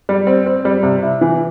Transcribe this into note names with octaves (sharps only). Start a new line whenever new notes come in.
G3
C4
C4
G3
C3
E4
E3